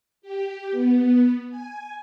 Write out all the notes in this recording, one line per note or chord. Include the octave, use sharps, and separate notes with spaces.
G4
B3
G#5